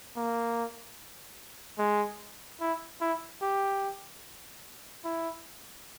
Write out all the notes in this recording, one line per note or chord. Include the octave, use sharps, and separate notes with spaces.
A#3
G#3
E4
E4
G4
E4